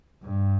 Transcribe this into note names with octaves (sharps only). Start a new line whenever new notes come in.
G2